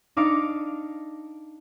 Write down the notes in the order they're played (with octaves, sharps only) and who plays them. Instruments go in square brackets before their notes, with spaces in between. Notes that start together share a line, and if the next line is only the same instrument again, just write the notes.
[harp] D4 D#4 F5 D6 C#7